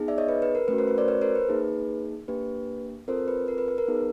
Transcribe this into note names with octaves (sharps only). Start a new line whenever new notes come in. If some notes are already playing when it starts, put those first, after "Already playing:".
Already playing: B3 D#4 G#4
D5 E5
C#5 D#5
B4
B4
A#4
A3 C#4 F#4 B4
A#4 C5
B4
C5 D5
B4 C#5
A#4 C5
B4
A#3 D#4 G#4
A#3 D4 G4 B4
C4 F4 A4 A#4 C5
B4
A#4
B4
B4
A#4
B3 D#4 G#4